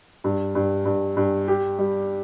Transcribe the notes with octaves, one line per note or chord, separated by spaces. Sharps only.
G2
G2
G2
G2
G4
G3